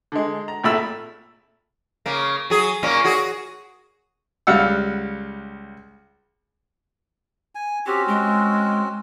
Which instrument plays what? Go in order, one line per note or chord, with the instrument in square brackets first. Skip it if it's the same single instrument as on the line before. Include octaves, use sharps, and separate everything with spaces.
[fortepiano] D3 G#3
A#5
G#1 A#2 A3 B5 E6
[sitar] C#3 A#3
F#3 G#4
A#2 A#3 C#4
F#4 G#4
[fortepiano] C#2 G3 F5 F#5 E6
[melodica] G#5
[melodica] C4 C#4 F#4 [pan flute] G4
[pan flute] G#3